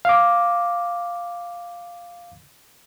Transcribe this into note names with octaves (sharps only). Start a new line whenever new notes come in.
F5 D6